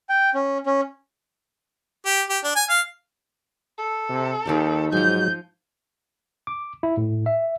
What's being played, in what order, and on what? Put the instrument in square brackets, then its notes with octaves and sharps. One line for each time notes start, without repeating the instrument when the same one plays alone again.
[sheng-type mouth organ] G5
C#4
C#4
[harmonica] G4
G4
D4
G#5
F5
[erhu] A4
[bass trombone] C3
[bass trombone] D#2 [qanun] D#3 G4 D5
[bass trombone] G#2 [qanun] F3 G#5 [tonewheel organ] F#3 [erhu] G6
[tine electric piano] D6
E4
A2
E5